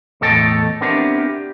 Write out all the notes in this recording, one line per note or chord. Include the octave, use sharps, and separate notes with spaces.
E2 A2 A4 D#5 G5 A5
B3 C4 D4 E4 G4 A#4
G4